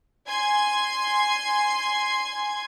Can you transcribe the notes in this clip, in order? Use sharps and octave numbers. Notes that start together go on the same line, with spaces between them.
G#5 C6 G#6